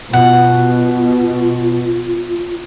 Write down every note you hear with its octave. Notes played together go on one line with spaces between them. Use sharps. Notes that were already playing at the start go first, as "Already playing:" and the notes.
B2 F4 F#5